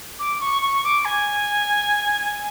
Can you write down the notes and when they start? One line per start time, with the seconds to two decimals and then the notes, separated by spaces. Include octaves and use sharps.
0.19 D6
0.41 C#6
0.62 C#6
0.84 D6
1.05 G#5